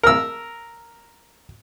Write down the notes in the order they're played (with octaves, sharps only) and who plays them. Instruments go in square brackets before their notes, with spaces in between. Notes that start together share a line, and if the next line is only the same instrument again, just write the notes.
[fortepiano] A#4 E6